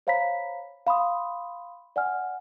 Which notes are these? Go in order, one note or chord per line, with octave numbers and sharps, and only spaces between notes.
C5 C#5 F5 A#5 B5 B6
F5 B5 C6 D#6
D5 F#5 G#5 F6